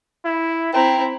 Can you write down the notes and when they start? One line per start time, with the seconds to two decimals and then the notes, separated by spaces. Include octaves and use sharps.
0.25 E4
0.74 C4 E4 C5 G5 A#5